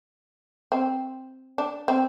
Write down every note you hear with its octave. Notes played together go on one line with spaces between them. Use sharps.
C4
D4
C4